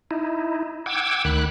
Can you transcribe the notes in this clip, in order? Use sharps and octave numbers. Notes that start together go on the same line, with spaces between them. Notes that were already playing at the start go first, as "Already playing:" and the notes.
D#4 E4
F#5 G5 D6 E6 G#6
D2 D#3 B5 F#6